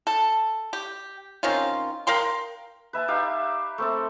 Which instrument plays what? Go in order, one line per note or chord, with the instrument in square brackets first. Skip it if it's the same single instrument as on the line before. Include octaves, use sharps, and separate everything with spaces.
[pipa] A4
G4
D#3 C4 C#4 F4
A#4 F5 G5 C6
[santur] B4 E5 G#5 A5
D#4 G4 E5 F5
A3 C4 A4